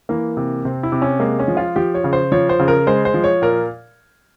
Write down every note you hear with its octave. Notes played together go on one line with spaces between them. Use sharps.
E3 A#3
C3
C3 C4
E4
C3
C#4
G#3 A#3
C#4
F3
F4
F3 G4
C#5
C#3
C5
F3 C#5
C5
C#3
A#4
G#3 C5
C5
F3
C#5
A#2 A#4